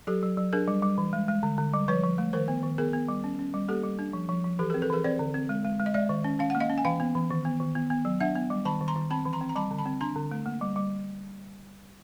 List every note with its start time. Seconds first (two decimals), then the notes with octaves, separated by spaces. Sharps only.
0.07 F#3 G4 A4
0.23 F#3
0.37 F#3
0.53 D4 G#4 A#4
0.68 G3
0.83 G3
0.98 E3
1.13 G#3
1.28 G#3
1.43 D3
1.58 D3
1.73 G3
1.88 F3 B4 C#5
2.03 F3
2.18 A3
2.33 D#3 A#4 C5
2.48 B3
2.63 D#3
2.78 B3 G#4 A#4
2.93 B3
3.09 G3
3.24 C#4
3.39 C#4
3.54 G3
3.68 A#3 G4 A4
3.84 G3
3.99 D4
4.13 F3
4.29 F3
4.44 F3
4.59 E3 G4 A4
4.70 C4 G#4 A#4
4.82 A4 B4
4.90 E3 G#4 A#4
5.04 C4 C5 D5
5.19 D3
5.34 C4
5.49 G#3
5.65 G#3
5.79 G#3
5.86 D#5
5.94 G#3 D5 E5
6.09 D#3
6.24 C#4
6.39 C#4 F5
6.50 A#3 F#5
6.60 D#5 F5
6.70 C#4
6.78 G#5
6.85 E3 F5 G5
7.00 B3
7.15 E3
7.31 D#3
7.45 B3
7.60 D#3
7.76 B3
7.90 B3
8.05 F#3
8.20 D4 E5 F#5
8.36 B3
8.50 G3
8.65 D#3 A5 B5
8.81 D#3
8.88 A#5 C6
8.96 D#3
9.10 C4 A5 B5
9.25 E3
9.33 A#5 C6
9.41 C4
9.49 A#5
9.56 G3 A5 B5
9.71 D3
9.78 A5 B5
9.86 C4
10.01 D4 A#5 C6
10.16 D3
10.31 A3
10.46 A#3
10.61 G3
10.76 G3